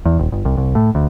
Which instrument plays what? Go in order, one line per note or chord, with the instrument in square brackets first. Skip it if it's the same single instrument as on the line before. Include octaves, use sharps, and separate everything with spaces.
[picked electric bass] E2
D#1
G1
C2
C2
A2
D2